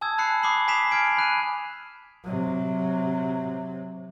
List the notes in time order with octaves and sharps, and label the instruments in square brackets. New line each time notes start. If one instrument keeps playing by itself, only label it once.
[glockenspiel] G#5 A5 D#6 E6 G#6
A5 B5 F#6 C7 C#7
B5 D6 D#6 C7 F#7
G#5 D#6 B6 C7 E7 F7
A5 F6 G#6 D7
B5 F#6 D#7
[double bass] C3 F#3